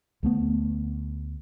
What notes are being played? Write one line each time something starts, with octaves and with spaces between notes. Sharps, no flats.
D2 A3 B3